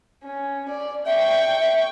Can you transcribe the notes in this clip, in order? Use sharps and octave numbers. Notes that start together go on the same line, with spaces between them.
C#4
D5
E5 G5 C#6